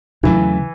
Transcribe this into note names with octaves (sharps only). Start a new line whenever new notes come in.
E2 C#3 E3 F#3 A3